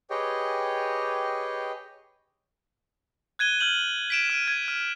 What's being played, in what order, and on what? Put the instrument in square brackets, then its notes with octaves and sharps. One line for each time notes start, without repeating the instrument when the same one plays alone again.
[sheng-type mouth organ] G4 G#4 B4 C#5 D#5 G5
[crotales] F#6 G#6 D#7 G7
F6 G6 F#7
B6 D7 E7
F6 D#7
G#6
F6